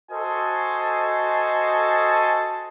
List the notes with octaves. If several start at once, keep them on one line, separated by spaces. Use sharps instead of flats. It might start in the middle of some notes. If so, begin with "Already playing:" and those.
F#4 A4 C5 D#5 G#5 A5